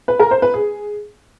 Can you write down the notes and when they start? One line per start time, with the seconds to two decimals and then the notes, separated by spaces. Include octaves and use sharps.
0.08 B4
0.19 A#4
0.31 C5
0.42 B4
0.54 G#4